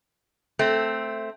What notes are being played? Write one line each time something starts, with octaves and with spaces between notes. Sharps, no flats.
A3 C4